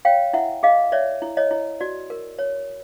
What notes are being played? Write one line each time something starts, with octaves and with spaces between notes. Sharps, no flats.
C#5 F5 G5
E4 E5 F#5
G#4 D#5 F5
C#5 D5 E5
E4
C#5 D#5
E4
F#4 D5
A#4
C#5